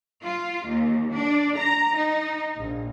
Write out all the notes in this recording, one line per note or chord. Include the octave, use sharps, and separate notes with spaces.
F4
D#2
D4
A#5
D#4
A#1